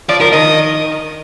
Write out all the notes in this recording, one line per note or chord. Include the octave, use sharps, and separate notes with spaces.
F3 D5
F3 A#4
D#3 D#5